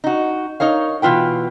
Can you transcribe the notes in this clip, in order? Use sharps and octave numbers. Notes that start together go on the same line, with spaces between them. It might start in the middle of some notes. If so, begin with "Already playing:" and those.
D#4 F#4
D#4 A#4 C#5 F5
B2 E3 F4 B4 G5